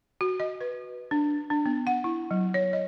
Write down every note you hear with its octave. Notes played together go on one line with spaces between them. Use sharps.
F#4
D#5
B4
D4
D4
B3
F#5
E4
F#3
C#5
D#5